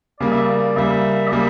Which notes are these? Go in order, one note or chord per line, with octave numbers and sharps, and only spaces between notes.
C#3 G3 A#3 D5
E5
D5
C#3 G3 A#3 E5
D5
C#3 G3 A#3 E5